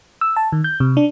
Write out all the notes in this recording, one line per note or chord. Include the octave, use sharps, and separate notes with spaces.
E6
A5
D#3
G6
C3
D4